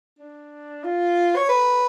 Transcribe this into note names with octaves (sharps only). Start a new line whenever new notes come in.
D4
F4
C#5
B4